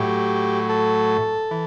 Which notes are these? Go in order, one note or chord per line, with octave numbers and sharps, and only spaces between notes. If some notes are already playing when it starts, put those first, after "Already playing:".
Already playing: A2 F#3 G4
A4
E3